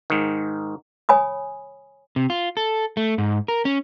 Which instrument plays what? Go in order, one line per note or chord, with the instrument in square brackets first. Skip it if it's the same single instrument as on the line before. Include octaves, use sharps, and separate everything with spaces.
[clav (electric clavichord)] G#2 D#3
[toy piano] C#5 G#5 B5 D#6
[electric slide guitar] C3
F4
A4
A3
G#2
A#4
C#4